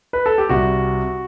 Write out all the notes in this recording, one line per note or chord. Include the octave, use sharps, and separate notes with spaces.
B4
A4
G4
C2 C3 G3 F#4